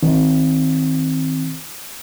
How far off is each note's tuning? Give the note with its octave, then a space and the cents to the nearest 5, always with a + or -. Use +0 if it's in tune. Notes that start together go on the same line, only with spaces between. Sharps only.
D#3 +25 C4 +0